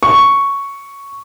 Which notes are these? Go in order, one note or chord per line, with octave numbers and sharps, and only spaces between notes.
C#6